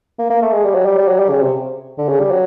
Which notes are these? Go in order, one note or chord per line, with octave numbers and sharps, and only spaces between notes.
A#3
A#3
A3
G#3
G3
F#3
G3
G3
F#3
G3
C#3
C3
D3
C#3
G3
F#3